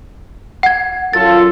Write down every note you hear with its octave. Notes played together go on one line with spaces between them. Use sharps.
F#5 G#6
F#2 F4 A4 A6